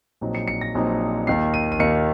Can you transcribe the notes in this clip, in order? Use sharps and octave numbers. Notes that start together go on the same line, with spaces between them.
A#1 A#2 F#3 C4 D#4
C#7
C#7
A#6
A#1 A#2 F#3 C4 D#4
D#2 D#3 A#3 C7
D#7
D#7
D#2 D#3 A#3 C#7